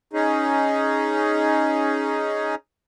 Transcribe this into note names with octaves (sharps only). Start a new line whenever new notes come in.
C#4 D#4 G#4